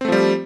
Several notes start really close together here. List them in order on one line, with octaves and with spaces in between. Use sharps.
C4 A3 F3 G3